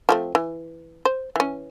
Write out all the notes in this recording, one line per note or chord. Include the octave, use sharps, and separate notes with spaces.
F3 A3 C4
E3
C5
E3 C#4